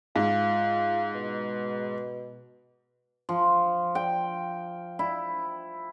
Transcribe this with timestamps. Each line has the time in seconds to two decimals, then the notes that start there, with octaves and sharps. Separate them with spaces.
0.16 G#2 F4
1.14 B2
3.29 F3
3.95 G5
4.99 E4